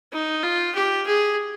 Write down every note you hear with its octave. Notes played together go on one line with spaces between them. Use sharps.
D#4
F4
G4
G#4